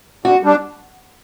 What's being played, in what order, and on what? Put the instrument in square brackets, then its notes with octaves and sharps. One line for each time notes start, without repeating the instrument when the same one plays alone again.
[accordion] D3 [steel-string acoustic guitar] F#4
[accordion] G3 D4